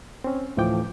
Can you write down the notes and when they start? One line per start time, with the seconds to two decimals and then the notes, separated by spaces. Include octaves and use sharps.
0.24 C4 C#4
0.57 D2 A2 E3 F3 G5 D6